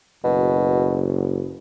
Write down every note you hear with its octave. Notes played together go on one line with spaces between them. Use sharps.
F#1 B2